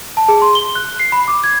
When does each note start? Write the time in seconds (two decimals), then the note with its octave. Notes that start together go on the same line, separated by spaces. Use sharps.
0.17 A5
0.29 G#4
0.42 C6
0.55 G7
0.75 F#6
1.00 C7
1.12 B5
1.28 D6
1.44 G#6